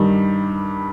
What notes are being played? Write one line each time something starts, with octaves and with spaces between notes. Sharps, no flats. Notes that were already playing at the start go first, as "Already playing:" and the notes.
Already playing: G2 D#3 G3